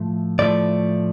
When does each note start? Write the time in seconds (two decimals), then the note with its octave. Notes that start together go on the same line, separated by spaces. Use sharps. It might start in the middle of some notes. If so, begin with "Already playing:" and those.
Already playing: A2 F3 A3
0.39 A2 F3 A3 D5